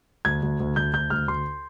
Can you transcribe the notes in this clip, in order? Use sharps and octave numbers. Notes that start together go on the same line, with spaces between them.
D2 G#6
D2
D2
D2 G6
D2 G6
D2 F6
D2 C6